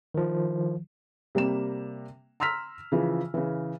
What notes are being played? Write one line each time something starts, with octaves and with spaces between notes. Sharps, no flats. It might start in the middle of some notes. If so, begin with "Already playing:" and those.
D#3 F3
C3 G3 A#3 E7
A#5 C6 E6 F6 B6
C#3 E3 F3
C#3 E3